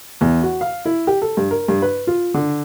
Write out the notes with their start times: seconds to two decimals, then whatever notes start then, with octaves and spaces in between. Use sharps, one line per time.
0.21 E2
0.42 F#4
0.61 F5
0.85 E4
1.07 G4
1.22 A4
1.37 G2
1.51 A#4
1.68 G2
1.82 B4
2.07 F4
2.34 D3